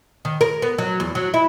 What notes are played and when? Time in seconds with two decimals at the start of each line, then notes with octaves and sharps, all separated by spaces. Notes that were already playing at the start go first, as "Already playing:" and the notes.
0.25 D#3
0.41 A#4
0.62 B3
0.78 F#3
1.00 E2
1.15 F#3
1.34 E4